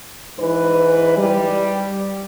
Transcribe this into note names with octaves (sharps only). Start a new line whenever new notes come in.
G#2 E3 B4
G3